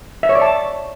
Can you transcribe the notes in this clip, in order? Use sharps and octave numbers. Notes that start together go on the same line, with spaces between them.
E5
C#5
D5
A5